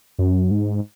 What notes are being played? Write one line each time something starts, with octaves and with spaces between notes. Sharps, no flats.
F#2
G#2